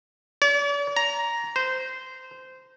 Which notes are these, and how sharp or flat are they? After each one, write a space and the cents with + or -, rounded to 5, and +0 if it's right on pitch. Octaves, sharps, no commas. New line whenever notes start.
D5 -45
A#5 +5
C5 -15